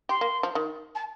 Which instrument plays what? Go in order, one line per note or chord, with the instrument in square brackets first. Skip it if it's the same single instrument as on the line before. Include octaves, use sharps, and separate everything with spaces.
[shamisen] G4 [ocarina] C6
[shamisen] A#3
F3
D#3
[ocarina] A5